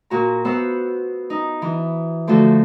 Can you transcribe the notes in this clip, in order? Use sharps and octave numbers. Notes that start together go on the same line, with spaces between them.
A#2 F#4 A#5
B3 C5 F#5 E6 F#6
D#4
E3
D3 F3 A3 F#4 A4